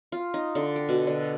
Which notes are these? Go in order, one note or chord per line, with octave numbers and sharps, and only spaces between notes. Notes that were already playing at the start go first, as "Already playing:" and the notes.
F4
D#4
D3
G5
B2
D3